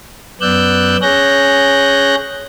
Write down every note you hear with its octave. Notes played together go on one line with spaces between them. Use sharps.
F#2 B3 D5 E6 F#6 G6
C#4 G#4 C#5 F#6 G6 A#6